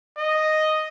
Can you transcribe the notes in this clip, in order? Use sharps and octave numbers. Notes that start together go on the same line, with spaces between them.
D#5